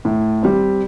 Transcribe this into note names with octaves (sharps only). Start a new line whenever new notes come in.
A2
G3 C4